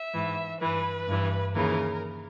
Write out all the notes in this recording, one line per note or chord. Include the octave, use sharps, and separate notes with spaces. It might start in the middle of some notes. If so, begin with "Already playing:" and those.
Already playing: E5
G#2 E3
G2 E3 B4
G2 E3
D#2 C#3 E3 A#4